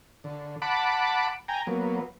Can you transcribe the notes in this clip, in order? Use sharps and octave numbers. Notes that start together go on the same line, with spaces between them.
D3
F#5 A5 B5 D6
G5 G#5 A#5
F#3 A#3 B3